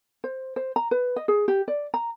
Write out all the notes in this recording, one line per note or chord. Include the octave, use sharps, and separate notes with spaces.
C5
C5
A#5
B4
D#5
G#4
G4
D5
A#5